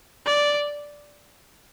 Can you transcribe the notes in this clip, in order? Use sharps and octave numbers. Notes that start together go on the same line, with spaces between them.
D5